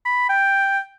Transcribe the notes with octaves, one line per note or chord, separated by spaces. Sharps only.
B5
G5